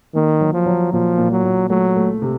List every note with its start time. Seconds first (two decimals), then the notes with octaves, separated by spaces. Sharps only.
0.15 D#3 A#3
0.41 F#3
0.53 F3
0.66 F#3
0.92 A#2 F3
1.18 A#2
1.31 F#3
1.43 A#2
1.70 F#3 A3
1.96 A3
2.22 C3